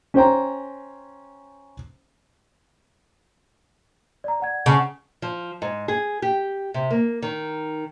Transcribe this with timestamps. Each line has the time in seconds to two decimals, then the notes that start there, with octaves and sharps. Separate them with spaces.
0.14 C#4 C5 G5 A#5
4.24 D5 A#5
4.40 D5 F#5 G#6
4.66 C#3 F#5 A5 C#6
5.22 F3
5.62 G#2
5.88 G#4
6.22 G4
6.74 C3
6.91 A#3
7.22 D#3